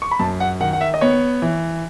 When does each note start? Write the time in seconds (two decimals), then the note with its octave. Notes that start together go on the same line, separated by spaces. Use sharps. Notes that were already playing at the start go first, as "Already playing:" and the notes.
0.02 C#6
0.11 B5
0.19 F#2 A5
0.40 F#5
0.61 D#3 F#5
0.73 F#5
0.81 E5
0.94 D#5
1.01 B3 C#5
1.42 E3